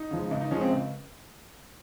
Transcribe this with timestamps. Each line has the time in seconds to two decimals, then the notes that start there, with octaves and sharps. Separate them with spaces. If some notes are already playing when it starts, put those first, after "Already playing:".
Already playing: D#4
0.11 C#3 F3 G#3
0.31 C#2
0.41 D#4
0.51 C#3 F3 G#3 C#4
0.61 C4
0.71 C#2